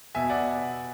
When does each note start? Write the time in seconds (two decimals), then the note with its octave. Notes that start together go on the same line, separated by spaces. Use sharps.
0.15 B2 E5 G#5
0.29 D5 F#5